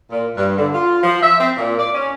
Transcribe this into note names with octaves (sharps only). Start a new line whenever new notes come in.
A#2
G2
D3
F4
F3
E5
C4
A#2
D5
C#4